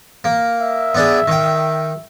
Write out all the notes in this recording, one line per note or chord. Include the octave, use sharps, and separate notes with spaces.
A#3
E5
B3 D4 G#4
D#3 G5